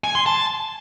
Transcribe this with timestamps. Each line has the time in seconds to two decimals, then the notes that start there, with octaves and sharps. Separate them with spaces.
0.04 G#5
0.15 C6
0.26 A5